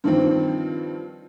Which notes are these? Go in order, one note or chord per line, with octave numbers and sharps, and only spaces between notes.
G2 D#3 F3 C4